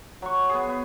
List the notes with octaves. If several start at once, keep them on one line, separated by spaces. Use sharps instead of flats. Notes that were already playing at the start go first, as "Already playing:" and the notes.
F#3 C#6
B3 G#4
B3